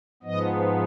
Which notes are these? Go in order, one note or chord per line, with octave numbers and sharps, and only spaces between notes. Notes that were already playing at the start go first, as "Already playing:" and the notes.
G#2 F3 B3 D#5